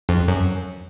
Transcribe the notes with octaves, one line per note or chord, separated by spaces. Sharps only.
F2
F#2